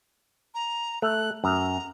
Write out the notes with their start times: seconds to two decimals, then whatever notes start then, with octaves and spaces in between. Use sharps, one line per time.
0.55 A#5
1.02 A3 F#6
1.44 F#2 A#5